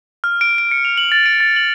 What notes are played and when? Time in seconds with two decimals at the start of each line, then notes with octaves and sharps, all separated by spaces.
0.24 F6
0.41 D7
0.58 D7
0.71 C#7
0.85 F7
0.98 F#7
1.12 A6
1.26 D7
1.40 A6
1.56 F#7